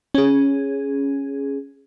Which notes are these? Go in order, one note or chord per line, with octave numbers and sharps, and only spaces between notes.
C#4 G#4